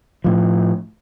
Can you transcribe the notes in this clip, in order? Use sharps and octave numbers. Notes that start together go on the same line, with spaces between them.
A2 F3